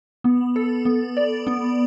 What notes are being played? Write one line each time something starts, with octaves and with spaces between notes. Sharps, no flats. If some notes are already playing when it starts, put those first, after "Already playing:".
B3
A4
B3
D5
B3